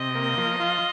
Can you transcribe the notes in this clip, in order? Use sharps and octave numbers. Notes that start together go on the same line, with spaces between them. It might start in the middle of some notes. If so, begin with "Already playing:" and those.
Already playing: C3 D#5
A#3
F3
F4